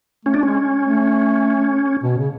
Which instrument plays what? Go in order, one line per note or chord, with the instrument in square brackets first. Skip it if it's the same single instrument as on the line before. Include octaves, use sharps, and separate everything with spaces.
[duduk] A3 [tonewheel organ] C#4
[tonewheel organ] D4
[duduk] G#3 [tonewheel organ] C#4
[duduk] A3
B2
C#3